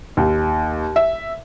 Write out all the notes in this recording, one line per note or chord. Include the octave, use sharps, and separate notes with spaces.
D#2
E5